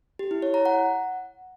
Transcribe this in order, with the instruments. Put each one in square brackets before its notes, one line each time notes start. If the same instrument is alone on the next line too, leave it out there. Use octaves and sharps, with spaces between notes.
[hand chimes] G4
E4
C#5
A#5
F#5